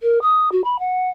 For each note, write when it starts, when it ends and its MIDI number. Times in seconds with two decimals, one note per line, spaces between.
0.01 0.19 70
0.22 0.49 87
0.52 0.64 66
0.64 0.76 83
0.79 1.10 78